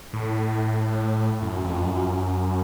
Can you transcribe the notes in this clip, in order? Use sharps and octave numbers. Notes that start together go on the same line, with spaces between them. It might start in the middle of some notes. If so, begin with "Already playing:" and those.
A2
F#2
F2
F#2